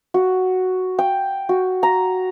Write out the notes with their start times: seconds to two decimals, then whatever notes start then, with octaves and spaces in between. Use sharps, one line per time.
0.14 F#4
0.99 G5
1.49 F#4
1.83 A#5